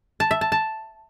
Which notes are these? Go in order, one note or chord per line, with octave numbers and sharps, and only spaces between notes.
A5
E5
A5
A5